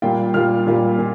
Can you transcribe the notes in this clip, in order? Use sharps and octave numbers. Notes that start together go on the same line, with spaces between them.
A#2 G3 A#3 F4 G5
A#2 G3 A#3 F4 F6
A#2 G3 A#3 F4
A#2